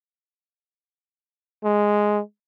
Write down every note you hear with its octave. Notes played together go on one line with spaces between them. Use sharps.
G#3